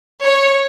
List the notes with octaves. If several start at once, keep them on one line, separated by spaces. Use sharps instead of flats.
C#5